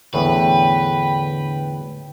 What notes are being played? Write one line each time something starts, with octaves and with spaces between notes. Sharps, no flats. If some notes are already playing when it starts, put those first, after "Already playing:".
E2 A2 D3 B4 G5